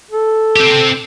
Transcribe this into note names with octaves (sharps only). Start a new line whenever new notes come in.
A4
C4 G4